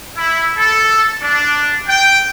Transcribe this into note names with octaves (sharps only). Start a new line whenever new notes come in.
E4
A4
D4
G5